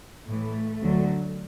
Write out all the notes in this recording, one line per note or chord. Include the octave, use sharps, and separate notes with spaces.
A2 E3 A3
D2 D3 F#3